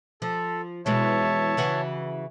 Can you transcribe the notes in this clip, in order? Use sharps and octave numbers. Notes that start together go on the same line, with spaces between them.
F3 A4
B2 E3 G#3 C#5 E5 A5
C#3 E3 F#4